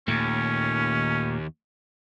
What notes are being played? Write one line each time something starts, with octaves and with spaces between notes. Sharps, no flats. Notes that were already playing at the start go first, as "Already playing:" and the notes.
D#2 A#2 A3 C#4